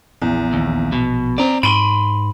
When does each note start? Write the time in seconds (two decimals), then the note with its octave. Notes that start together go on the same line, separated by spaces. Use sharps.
0.22 A#1 E2
0.53 D#2
0.92 B2
1.38 C4 D5 A#5
1.63 G#2 B5 C6 D7 D#7